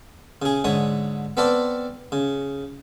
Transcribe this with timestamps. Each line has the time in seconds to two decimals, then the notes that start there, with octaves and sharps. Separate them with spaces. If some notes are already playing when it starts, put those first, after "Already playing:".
0.42 C#3 G#4
0.64 G#2 D3 C#5 D#6
1.37 B3 C4 A4 D5 F5 G5
2.12 C#3